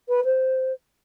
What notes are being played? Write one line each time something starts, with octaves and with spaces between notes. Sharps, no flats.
B4
C5